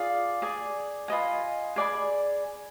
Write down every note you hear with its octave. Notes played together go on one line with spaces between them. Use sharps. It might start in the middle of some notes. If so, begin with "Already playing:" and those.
Already playing: F4 G#4 D5
G#4 D5 G#5
F4 B4 D#5 G#5
G#4 D5 G#5 B5